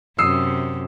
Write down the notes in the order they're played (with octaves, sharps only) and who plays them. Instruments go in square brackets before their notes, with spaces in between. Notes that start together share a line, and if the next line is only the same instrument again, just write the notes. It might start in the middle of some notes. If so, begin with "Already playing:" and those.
[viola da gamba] F#2 C3 [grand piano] D#6 E6 C7